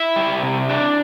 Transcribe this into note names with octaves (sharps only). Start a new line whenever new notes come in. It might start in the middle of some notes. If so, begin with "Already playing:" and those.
Already playing: E4 E5
G3
C3
D4